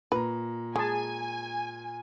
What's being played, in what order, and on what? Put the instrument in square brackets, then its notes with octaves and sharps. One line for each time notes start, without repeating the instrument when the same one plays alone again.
[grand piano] A#2 A#5 [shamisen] B4
[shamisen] G#3 [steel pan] G#4 A5 [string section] G#5